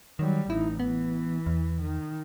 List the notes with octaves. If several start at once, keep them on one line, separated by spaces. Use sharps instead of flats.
D#3 F#3 G3
A1 D#4 E4
E3 B3
E2
D#3